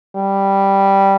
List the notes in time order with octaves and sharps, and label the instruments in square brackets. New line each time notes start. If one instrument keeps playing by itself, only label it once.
[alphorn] G3